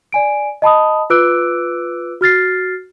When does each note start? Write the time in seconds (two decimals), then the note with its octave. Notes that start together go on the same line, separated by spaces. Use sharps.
0.12 D5 G#5 D7
0.62 D#5 A5 B5 D#6
1.10 F4 B4 D6 E6 F#6 D7
2.21 F#4 F6 A6 C7